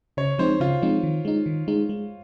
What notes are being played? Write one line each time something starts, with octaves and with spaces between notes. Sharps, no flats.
C#3 C#5
F3 G#3 C4 D#4 C5
C#3 F4
F3 G#3 C4 D#4
D#3
G#3 D#4
D#3
G#3 D#4
G#3